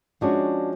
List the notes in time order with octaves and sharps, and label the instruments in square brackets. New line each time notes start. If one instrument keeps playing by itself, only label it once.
[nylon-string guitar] F3 G#3 C#4 G#4 [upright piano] D4 F#4